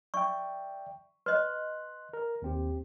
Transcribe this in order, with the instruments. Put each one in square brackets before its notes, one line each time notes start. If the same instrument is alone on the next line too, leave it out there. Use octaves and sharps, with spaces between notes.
[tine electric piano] D5 E5 G5 [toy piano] C#6
[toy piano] B4 D#5 [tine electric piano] C6 F#6
[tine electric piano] A#4
D#2 C4 G4